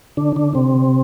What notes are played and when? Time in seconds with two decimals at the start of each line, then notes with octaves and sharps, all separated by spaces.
0.17 D3 D4
0.36 D3 D4
0.55 C3 C4